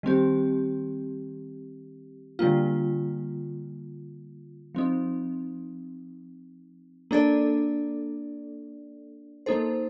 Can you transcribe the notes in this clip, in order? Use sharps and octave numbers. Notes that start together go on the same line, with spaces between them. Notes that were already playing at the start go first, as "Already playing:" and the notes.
D#3 G3 C4 G4
D3 G3 A#3 F4
F3 C4 D#4
A#3 D4 A4 D5
A#3 D#4 A4 C5